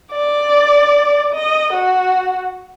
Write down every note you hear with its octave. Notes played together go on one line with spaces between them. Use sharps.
D5
D#5
F#4